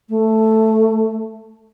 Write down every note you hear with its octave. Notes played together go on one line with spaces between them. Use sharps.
A3